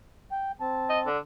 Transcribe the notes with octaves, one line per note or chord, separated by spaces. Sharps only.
G5
C4 A5
D#5
D3